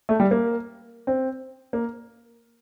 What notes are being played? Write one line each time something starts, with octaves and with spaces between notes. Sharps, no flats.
A3
G3
A#3
C4
A#3